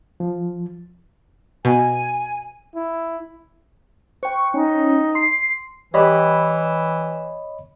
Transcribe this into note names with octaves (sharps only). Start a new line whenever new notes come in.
F3
B2 G#5
E4
C5 G5 C#6
C#4 D#4
C6 C7
E3 G3 G4 C#5 D#5 B5